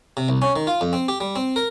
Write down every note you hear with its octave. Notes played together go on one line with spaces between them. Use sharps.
C3
C2
C#4
D#3
F4
F2
C4
G4
G3
C4
A#4